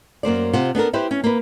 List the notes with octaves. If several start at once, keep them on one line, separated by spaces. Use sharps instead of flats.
F#2 A#3 C5 D5
C3 F4 C5 F#5
B3 D4 A4 A#4
E4 G4 B4 C5
C#4
A#3 B4